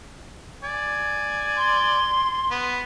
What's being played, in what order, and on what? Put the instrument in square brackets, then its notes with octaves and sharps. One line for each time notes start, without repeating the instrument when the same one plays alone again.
[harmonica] D5 G#5
[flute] C6
[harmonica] B3